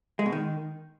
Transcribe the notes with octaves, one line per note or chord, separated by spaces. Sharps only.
G#3
B2
D#3